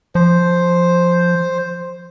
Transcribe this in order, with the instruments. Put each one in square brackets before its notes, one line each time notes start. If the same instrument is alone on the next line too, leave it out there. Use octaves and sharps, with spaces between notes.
[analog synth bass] F3 [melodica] C5